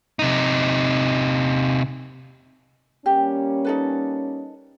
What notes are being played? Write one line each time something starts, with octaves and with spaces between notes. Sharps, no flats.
C3 D#4
G3 A#3 C#4 G4
D#4 A4 B4